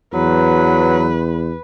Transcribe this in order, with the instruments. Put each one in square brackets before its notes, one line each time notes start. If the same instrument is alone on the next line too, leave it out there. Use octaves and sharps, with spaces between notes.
[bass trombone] E2 [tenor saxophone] F#3 [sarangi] B4